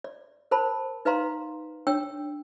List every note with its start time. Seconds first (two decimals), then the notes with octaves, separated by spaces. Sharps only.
0.04 D5
0.51 A#4 C5 A5 B5
1.05 D#4 B4 D5 F5 A#5 C6
1.87 D4 C#5 G5 E6